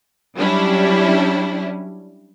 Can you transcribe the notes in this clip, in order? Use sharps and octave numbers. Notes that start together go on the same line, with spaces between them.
F#3 G3 C#4 D4 E4